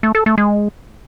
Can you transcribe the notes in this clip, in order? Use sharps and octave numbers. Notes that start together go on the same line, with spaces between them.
A3
A4
A3
G#3